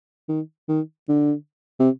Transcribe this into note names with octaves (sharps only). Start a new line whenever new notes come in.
D#3
D#3
D3
C3